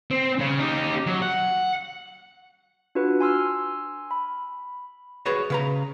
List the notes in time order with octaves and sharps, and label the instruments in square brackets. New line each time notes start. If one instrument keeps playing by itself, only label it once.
[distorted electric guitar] C4
C#3
D#4 G4
F#3
F#5
[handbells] D4 F4 F#4 B4
G#5 C6 E6 F6
B5
[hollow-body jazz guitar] F#4 G#4 B4 C#5 D5
C#3 B4 A#5